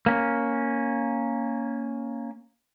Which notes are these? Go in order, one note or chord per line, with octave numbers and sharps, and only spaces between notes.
A#3 C#4